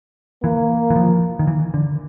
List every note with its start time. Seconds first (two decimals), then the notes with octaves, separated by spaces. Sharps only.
0.43 E3 A#3
0.90 E3
0.96 F3
1.39 D#3
1.47 E3
1.74 D3